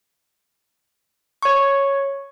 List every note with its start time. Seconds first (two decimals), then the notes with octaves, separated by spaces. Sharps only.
1.42 C#5 C#6